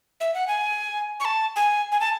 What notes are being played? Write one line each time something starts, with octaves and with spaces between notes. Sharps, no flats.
E5
F#5
G#5
C#6
A5
G#5
G#5
A5